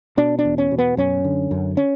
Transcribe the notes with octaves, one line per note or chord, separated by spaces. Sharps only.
B2 D4
D4
E2
C#4
B2
B3
F#2 C#4
D3
F#2
C#4